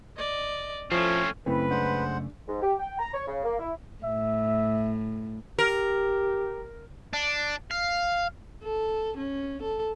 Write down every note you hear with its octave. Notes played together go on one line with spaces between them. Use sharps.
D5 D#5
F3 A3 C4 C#4 E4 A4
F#2 C#3 A3 C4 E4 B4
G#3 D4 C5 F#5
G#2
G4
G5
A#5
C#5
C#3
A#3
E4
A2 E5
G4 A#4
D4
F5
A4
C#4
A4